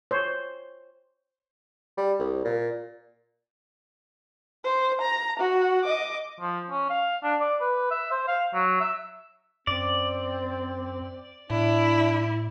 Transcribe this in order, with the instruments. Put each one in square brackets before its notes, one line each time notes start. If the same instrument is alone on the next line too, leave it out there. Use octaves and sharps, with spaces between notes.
[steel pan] C5 C#5
[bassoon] G3
C2
A#2
[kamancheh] C5
A#5
F#4
D#5 D6
[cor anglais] F3
C#4
F5
D4
D5
B4
E5
C5
F5
F#3
E5
[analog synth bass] F#2 [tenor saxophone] C4 [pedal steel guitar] D5
[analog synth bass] A2 [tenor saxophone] D4 [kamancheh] E4